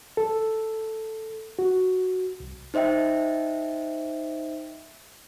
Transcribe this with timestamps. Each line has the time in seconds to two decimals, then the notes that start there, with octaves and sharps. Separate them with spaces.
0.17 A4
1.59 F#4
2.40 C2
2.74 D#4 C5 D#5 E5 G5